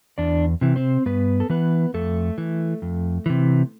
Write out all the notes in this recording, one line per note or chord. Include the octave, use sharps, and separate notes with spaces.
E2 D4 D5
C3 E3
C4 C5
G2 B3 B4
A4
E3 B3 B4
F2 A3 A4
E3
F2
C3 E3